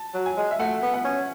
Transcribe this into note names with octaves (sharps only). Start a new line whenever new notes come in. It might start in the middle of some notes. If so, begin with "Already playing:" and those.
Already playing: A5
F#3
G#5
G#3
E5
A3 F#5
B3
F#5
C#4